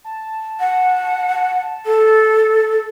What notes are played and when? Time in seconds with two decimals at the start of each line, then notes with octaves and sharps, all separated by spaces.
0.04 A5
0.60 F#5
1.86 A4